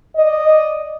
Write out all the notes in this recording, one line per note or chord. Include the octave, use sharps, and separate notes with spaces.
D5 D#5